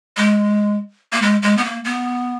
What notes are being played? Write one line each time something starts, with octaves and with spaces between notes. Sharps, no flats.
G#3
A#3
G#3
G#3
B3
A#3
B3